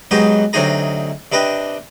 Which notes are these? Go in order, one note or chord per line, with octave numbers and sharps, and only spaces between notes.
G#2 F#3 G#3 B3 D#4 G4
D2 C3 F#3 D#4 G#4 A#5
C3 D4 B4 D#5 G5